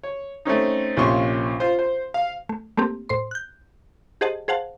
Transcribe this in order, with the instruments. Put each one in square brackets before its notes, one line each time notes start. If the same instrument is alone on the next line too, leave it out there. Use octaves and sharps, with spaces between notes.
[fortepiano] C#5
A3 C4 C#4 D#4
A#1 C3 C#4 F4 C6 C#6
F4 C5
C5
F5
[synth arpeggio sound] A3
A3 A#3 C4 G4
A2 C5 C6
F#6 G6
G4 G#4 C5 D#5 F#5 A5
G#4 C5 F5 F#5 A5